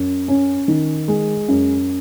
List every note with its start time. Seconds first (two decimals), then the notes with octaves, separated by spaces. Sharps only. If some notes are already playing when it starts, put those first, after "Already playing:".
Already playing: F#2
0.28 C#4
0.68 D#3
1.08 G#3
1.48 F#2